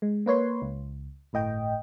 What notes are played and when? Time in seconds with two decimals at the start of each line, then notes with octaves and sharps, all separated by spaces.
0.02 G#3
0.26 A#3 B4 C#5 C6
0.62 C#2
1.33 G1 A2 D#5 G5